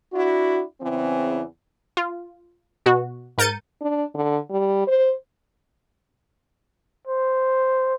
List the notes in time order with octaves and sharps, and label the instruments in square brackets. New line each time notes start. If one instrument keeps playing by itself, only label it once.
[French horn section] D4 E4 F#4
E2 C#3 E3 C4
[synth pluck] F4
B2 F#4
G#2 A#4 G6 A6 C#7 D#7
[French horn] D4
D3
G3
C5
[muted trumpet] C5